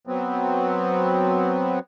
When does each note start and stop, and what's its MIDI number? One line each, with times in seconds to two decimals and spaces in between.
0.07 1.79 54
0.07 1.79 59
0.07 1.79 60